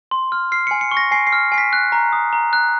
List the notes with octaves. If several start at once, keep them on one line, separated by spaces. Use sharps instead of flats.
C6
F6
F6 C7
G#5 C#7
C#7
C#6
A#6
G#5 C7
C7
F6
G#5 C7
B6
F#6
A#5
D#6
A#5
F#6